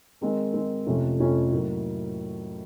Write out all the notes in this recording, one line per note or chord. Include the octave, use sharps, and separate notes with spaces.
D#3 G#3 C4
D#3 G#3 C4
F2 C3 F3 A3 C#4
F2 C3 F3 A3 C#4
A2 F#3 A#3